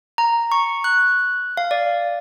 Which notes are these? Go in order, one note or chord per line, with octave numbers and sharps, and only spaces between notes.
A#5
C#6
F#6
F5
D5